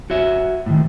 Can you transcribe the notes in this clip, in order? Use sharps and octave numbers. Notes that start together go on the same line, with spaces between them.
F#4 C#5 E5
A2 D#3